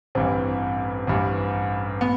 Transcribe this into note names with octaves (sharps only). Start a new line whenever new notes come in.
A1 G2 E3 C4
A1 G2 E3
B3